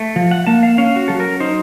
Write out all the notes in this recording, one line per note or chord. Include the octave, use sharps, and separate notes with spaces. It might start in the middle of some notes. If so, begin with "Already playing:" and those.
Already playing: A3
F3
F#5
A#3 A5
F5
C#4 F5
F#4
F#3 A4
A#4
D#4 C5